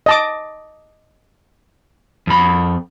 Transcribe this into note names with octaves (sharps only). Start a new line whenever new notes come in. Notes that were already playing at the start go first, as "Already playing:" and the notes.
D#5 A5 D6
F2 B5